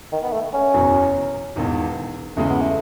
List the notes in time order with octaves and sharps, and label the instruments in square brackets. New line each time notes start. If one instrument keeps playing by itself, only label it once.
[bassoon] D#3
B3
A3
C#4
[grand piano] F#1 E2 B2 F#3
E1 E2 D#3
[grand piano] E2 C#3 G#3 [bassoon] A3
[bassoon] B3
A3